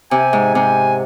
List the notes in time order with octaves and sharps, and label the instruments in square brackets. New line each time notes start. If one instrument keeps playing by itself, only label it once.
[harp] C3 [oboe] G#5
[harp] G#2
[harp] C3 [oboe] G#5